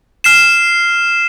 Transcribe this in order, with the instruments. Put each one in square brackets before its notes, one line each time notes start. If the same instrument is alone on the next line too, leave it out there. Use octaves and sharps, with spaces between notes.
[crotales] F6 C7 E7